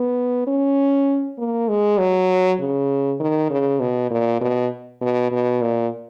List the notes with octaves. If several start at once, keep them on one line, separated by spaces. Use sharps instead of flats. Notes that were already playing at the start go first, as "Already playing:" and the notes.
Already playing: B3
C#4
A#3
G#3
F#3
C#3
D#3
C#3
B2
A#2
B2
B2
B2
A#2